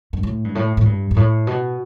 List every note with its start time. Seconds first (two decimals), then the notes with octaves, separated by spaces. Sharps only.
0.13 G2
0.23 A2
0.44 G2
0.55 A2
0.77 A2
0.85 G2
1.11 G2
1.16 A2
1.47 B2